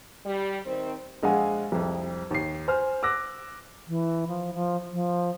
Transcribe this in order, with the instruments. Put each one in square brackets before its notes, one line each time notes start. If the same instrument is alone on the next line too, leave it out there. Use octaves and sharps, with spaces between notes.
[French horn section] G3
D#3 C4
[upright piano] A#1 G#3 F5 F#5 G#5
C2 F2
D#2 C7
C5 G#5 F6
D6 E6 F#6 A#6
[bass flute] E3
F3
F3
F3